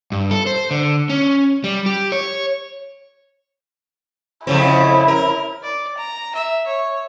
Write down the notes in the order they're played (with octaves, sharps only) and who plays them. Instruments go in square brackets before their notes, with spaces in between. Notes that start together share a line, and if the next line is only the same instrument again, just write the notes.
[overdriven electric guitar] G2
A4
C5
D3
C#4
G3
G4
C#5
[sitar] F2 C#3 C4 [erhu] E4
[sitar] A#4
[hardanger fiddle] D5
A#5
E5
C#5